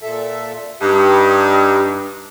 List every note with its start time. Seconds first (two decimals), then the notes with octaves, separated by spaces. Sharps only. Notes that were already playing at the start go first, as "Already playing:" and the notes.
0.02 A#2 A4 E5
0.81 G2 D#4 G4